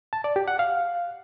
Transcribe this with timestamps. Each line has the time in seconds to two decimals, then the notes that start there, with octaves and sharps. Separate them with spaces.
0.13 A5
0.24 D5
0.36 G4
0.48 F#5
0.59 F5